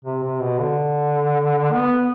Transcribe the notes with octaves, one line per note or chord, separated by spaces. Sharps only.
C3
C3
B2
D3
B3